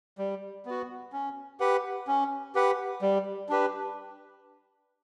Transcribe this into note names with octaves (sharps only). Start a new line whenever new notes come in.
G3
B3 F#4
C#4
G4 B4 F#5
C#4
G4 B4 F#5
G3
D4 G4 B4